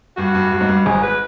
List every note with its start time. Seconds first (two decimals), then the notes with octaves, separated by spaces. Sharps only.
0.17 G2 F#4
0.35 G2
0.51 G2
0.60 G#2
0.68 G2
0.85 G#1 G#2 G#4
1.02 B4